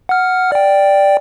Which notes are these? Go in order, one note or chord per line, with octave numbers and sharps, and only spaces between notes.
F#5 F6
D5 G5